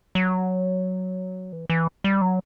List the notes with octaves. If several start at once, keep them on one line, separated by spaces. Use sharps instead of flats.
F#3
E3
E3
G3
F#3